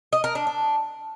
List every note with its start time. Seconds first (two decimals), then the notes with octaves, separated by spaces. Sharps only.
0.13 D#5
0.24 A#4
0.35 D4
0.47 D4